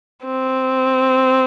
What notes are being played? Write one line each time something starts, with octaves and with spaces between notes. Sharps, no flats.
C4